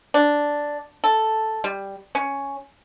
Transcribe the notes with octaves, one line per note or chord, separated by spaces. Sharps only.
D4
A4
G3
C#4